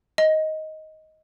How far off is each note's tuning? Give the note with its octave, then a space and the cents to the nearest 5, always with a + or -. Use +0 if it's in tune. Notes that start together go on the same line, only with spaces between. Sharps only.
D#5 +10